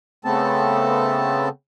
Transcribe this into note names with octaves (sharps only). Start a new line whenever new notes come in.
C#3 A3 B3 C4 A4 A5